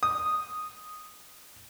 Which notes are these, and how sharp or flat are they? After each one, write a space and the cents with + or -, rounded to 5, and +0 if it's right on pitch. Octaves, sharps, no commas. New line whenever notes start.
D#6 -5